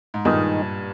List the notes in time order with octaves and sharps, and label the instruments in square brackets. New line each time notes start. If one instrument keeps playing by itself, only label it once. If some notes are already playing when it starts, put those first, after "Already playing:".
[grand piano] G#2
[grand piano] G2 A#2 [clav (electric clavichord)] D#3 G#3 D#4